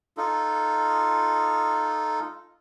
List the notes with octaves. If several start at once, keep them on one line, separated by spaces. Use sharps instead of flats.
D#4 F4 A4